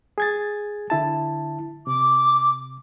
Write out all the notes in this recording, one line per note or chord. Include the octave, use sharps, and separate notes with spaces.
G#4 G#6 A6
D3 E4 A5
C3 D6